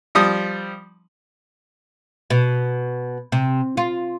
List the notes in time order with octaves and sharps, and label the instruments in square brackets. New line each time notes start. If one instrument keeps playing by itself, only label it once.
[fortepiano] F3 G3 D#6
[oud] B2
C3
F4